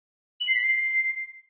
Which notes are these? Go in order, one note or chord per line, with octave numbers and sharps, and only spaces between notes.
F#7
C7
B6
C7